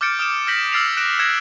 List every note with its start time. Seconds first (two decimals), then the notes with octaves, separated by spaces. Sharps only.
0.01 D6 F6 G6 A6 C#7 D7
0.19 D#6 F6 D7 E7
0.47 F6 G6 A#6 B6 F#7
0.72 E6 F6 A6 C7 D7 F7
0.97 F#6 A#6 D7 E7
1.19 F6 F#6 G#6 A#6 C#7 E7